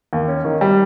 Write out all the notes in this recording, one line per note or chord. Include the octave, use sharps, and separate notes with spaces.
D#2
C#4
D#3
G3